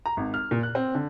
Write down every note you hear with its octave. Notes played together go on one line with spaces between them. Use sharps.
A#5
G#1
F6
A#2
F#6
C4
D3